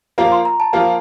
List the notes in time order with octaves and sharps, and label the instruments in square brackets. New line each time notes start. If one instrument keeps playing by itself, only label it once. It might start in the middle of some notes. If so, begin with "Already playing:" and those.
[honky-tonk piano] F3 A#3 F4 [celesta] A#5
[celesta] C6
A#5
A5
[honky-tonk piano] F3 A#3 F4